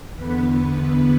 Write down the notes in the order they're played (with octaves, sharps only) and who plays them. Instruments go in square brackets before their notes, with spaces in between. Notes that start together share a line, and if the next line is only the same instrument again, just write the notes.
[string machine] E2 D3 B3 B4